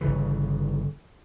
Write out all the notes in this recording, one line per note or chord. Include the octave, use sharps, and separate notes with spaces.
G1 C#3 E3